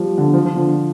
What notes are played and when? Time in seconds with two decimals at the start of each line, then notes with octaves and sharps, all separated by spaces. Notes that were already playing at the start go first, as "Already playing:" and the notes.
Already playing: F3 G3
0.18 D3
0.34 F3
0.45 F3
0.56 D3